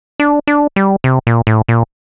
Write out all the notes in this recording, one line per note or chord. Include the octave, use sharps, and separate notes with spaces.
D4
D4
G3
C3
A#2
A2
A#2